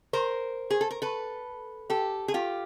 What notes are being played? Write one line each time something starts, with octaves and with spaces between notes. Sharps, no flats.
A#4 C5
G#4
A4
A#4
A4 B4
G4 A4
G#4
F4 G4